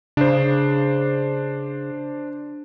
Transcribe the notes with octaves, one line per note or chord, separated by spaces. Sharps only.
C#3 D4 C5